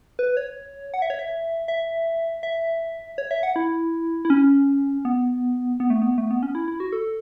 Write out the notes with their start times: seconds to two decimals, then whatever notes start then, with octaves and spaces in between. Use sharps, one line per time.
0.19 B4
0.37 C#5
0.94 F#5
1.02 E5
1.10 C#5
1.19 E5
1.68 E5
2.43 E5
3.18 C#5
3.31 E5
3.43 F#5
3.56 E4
4.25 E4
4.30 C#4
5.05 B3
5.80 B3
5.90 A3
6.02 B3
6.18 A3
6.31 B3
6.43 C#4
6.55 E4
6.68 E4
6.80 F#4
6.92 A4